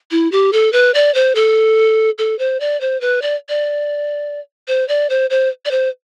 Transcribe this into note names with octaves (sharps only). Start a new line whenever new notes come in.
E4
G4
A4
B4
D5
C5
A4
A4
C5
D5
C5
B4
D5
D5
C5
D5
C5
C5
D5
C5